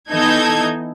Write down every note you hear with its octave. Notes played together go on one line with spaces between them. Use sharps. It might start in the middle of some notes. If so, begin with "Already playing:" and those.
E3 B3 D#4 A4 G6 G#6